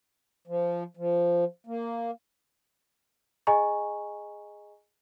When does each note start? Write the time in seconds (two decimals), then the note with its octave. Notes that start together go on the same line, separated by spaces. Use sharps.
0.47 F3
0.97 F3
1.67 A#3
3.47 G#4 D#5 G#5 A#5 C#6